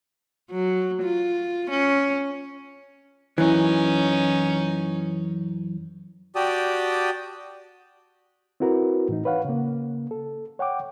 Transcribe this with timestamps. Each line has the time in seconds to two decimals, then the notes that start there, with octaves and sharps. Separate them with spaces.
0.50 F#3
1.02 F4
1.70 C#4
3.38 F#2 E3 C#4 D#4
6.35 F#4 G4 D5 G5 A5 D#6
8.60 C4 E4 F#4 A#4 B4
9.09 A2 E3 D#4
9.25 B4 C#5 F5 F#5
9.45 C#3 A#3
10.11 A4
10.59 C#5 F#5 G5 D6